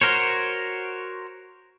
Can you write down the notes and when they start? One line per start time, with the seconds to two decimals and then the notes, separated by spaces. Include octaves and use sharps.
0.01 F#4 A#4 C5 C#5